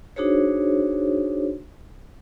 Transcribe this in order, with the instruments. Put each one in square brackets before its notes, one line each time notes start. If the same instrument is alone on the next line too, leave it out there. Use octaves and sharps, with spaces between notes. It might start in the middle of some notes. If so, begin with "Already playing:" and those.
[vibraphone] D4 D#4 F#4 G#4 C5 C#5